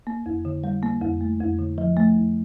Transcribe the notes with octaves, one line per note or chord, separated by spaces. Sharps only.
A#3
F2
D3
G3
A#3
F2
A3
F2
D3
F3
A3
F2